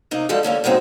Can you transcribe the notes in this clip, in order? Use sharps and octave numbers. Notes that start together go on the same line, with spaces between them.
C3 A#3 D#4
E2 F3 G3 G#3 A4
D3 A#3 C#4 A4
F#2 A2 G#3 C4 D#4